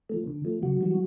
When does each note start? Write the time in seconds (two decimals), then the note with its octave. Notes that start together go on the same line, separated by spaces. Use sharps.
0.09 F3 A3
0.27 D3
0.45 F3 A3
0.62 C#3 F#3 F#4
0.81 E3 G3